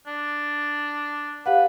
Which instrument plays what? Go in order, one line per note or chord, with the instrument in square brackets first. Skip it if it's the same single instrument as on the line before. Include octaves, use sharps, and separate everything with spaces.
[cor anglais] D4
[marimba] G4 F5 F#5 [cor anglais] B4